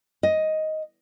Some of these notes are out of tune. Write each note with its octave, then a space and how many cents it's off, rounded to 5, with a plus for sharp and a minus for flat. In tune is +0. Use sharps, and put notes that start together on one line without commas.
D#5 +10